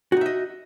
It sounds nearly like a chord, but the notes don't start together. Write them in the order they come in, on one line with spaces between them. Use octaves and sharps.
F#4 D#4 E5 D#5